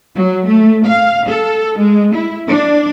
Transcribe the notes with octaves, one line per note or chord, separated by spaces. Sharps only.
F#3
A3
F5
A4
G#3
E4
D4